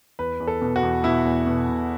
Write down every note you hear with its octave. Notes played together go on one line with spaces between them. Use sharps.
E2 B4
E2
A4
B2
F#4
E2
B2 E4
E2
B2
B2